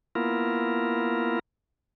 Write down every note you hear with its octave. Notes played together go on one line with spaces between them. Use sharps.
A#3 B3 E4 F4 A#4